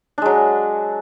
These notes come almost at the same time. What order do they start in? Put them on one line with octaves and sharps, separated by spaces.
D4 G#3 F#3